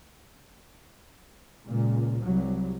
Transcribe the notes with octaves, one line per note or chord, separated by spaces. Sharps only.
C#2 A#2
C2 F#3